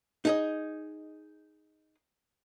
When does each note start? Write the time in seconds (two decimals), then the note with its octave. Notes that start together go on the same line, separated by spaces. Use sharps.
0.25 D#4 G#4 D#5